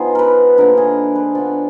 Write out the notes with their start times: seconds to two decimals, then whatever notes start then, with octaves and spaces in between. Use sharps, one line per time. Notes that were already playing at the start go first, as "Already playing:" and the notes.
Already playing: F3 B3 D#4 G#4
0.15 A#4 B4
0.58 D3 F3 A#3 A#4
0.77 G#4
1.15 B4
1.35 F3 B3 D4 D5